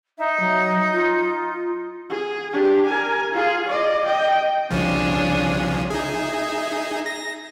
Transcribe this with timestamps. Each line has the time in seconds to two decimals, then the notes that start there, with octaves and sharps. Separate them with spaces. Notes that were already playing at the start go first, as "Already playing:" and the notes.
0.18 D#4 E5
0.40 F#3
0.93 F4
2.09 G#4
2.53 D4 G4
2.86 A#4 G#5
3.32 F4 G#4
3.68 D5 D#5
4.05 D#5 G5
4.71 C2 C#3 F3 D4 G#4 C#5
5.90 D#4 G#4 E5
7.06 A#6